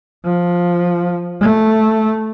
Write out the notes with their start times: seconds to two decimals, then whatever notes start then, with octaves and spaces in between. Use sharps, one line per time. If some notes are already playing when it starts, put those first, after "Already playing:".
0.25 F3
1.41 A3